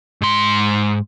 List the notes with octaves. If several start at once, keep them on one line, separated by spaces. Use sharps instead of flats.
G#2 C6